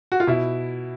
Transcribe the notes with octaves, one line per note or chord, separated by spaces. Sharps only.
F#4
F4
B2 E4